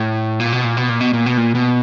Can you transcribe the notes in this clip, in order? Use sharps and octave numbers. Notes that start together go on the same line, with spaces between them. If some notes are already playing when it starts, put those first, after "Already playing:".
Already playing: A2
A#2
B2
A#2
B2
A#2
B2
A#2
B2
A#2
B2